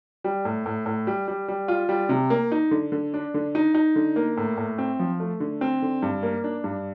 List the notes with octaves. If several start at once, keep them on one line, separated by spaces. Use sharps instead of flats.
G3
A2
A2
A2
G3
G3
G3
F4
G3
C3
A#3
D#4
D3
D3
D4
D3
D#4
D#4
D3
A#3
A2
A2
C4
F3
A3
D3
C4
D3
G2
A#3
D4
G2